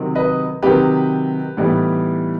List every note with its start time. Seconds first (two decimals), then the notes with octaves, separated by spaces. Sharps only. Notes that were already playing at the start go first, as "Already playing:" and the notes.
Already playing: C3 D#3 F#3 C4 D#4
0.15 B4 D#5
0.62 C3 D#3 F#3 C4 D#4 G4 B4
1.57 A2 E3 G3 B3 D#4